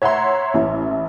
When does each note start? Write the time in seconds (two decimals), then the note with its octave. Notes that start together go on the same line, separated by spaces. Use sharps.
0.02 C#5 E5 F#5 A#5 C6
0.54 A1 E4